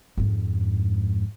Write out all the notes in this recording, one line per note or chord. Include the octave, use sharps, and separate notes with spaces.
F2 G#2